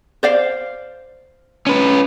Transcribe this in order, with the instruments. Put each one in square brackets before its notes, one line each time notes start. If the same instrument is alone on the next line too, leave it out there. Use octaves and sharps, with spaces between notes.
[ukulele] C5 D5 F5
[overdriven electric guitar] C#4 B4